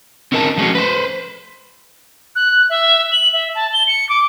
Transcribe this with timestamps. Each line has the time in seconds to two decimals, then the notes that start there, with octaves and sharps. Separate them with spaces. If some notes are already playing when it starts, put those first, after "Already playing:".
0.32 C4 C#4 D#4 A#4 D#5 A5
0.57 F3 G#3 A3 C#4 F#4
0.75 B4 C5
2.36 F#6
2.70 E5
3.12 F#7
3.33 E5
3.55 A5
3.73 G7
3.87 C#7
4.09 D6